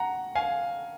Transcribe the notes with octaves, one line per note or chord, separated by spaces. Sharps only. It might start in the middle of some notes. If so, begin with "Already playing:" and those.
Already playing: F#5 A#5
F5 G#5